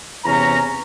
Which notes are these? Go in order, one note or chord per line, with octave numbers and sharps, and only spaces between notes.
E2 C3 C#4 A#5